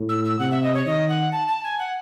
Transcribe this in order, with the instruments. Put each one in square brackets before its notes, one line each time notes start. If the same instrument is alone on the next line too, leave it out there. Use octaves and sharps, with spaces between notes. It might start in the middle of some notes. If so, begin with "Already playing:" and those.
Already playing: [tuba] A2
[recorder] E6
E6
[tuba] C3 [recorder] F#5
[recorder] E5
D#5
C#5
[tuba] D#3 [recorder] D#5
[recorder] F#5
A5
A5
G#5
F#5